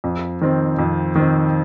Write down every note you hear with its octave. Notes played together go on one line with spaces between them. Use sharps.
F2
D#3 C4
F2
D#3 C4